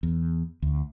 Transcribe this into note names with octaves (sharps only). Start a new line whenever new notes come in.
E2
D2